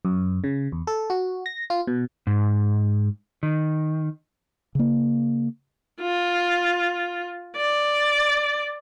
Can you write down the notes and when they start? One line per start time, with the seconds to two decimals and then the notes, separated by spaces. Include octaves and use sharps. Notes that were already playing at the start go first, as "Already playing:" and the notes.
0.05 F#2
0.44 C#3
0.72 E2
0.87 A4
1.10 F#4
1.46 A#6
1.70 F4
1.87 B2
2.27 G#2
3.43 D#3
4.75 C#3 A#3
6.01 F4
7.57 D5